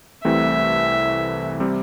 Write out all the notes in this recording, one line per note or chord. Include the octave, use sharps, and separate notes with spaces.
C2 C3 E3 A3 C4 E5
C3 G3 C4